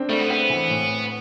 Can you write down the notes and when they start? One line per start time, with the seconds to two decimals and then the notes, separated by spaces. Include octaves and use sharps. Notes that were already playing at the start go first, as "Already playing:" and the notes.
Already playing: C4 D4
0.09 G3 A3
0.19 B3
0.30 B3 C4
0.50 E3
0.70 A2